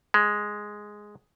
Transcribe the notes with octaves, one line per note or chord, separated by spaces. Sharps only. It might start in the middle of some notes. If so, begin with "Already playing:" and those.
G#3